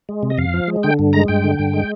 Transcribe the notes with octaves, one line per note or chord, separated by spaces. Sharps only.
G#3
C3
D#5
F2 F5
F3
G#3
D3 G5
G2
G#3 A#5
G2 G5
D3
G2
G#3